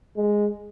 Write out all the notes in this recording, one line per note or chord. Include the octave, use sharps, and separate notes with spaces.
G#3